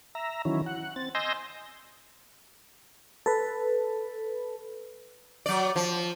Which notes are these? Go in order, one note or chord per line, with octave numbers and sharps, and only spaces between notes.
E5 A#5
D#3 E3 F#3 C#4 E4
F#5
C4 A6
D#5 G#5 C6 E6 G6 A#6
A4 B4
F#3 D5
F3